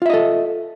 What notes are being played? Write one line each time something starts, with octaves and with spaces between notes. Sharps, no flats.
F4 A4 D#5 E5